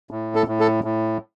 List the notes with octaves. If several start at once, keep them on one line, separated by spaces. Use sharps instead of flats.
A2
A4
A2
A4
A2